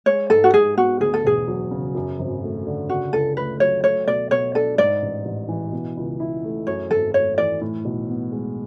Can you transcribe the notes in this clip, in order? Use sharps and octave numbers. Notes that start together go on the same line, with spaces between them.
G#3 C#5
G#2 A4
F#4
G#2 G#4
B3 F#4
D2 G#4
A4
E1 G#4
F#3
C#3
F#2
G#1
A3
D3
C#3 F#4
C#2 A4
A3 B4
F#3 C#5
A3 C#5
B2 D5
B2 C#5
D4 A4
G#2 D5
A1
A1
E3
B2
C#2
E4
A3
F#2 C#5
G#1 A4
A3 C#5
E3 D5
A2
B1
B3
G#3